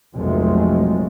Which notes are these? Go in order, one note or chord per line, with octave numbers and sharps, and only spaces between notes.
F1 A#1 F3 F#3 G#3 A3